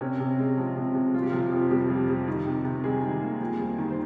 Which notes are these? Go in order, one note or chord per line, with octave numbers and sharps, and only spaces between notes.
C3 C#4
C3
G#3
F3
C3
C3
G3 F4
G4
C3 F3 F4
F2
C3 G3 G4
F2
G3
D#3
C3
C3
G3 G#3 G#4
D#3
A#3
F2
G3
D#3
C5